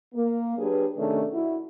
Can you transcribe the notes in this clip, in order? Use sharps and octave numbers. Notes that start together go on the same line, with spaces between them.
A#3
F#3 D4 G4 G#4 B4
C3 D#3 A3 C#4 D4 G#4
E4 F#4